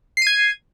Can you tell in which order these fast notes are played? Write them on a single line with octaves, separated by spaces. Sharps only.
C7 D#7 G#6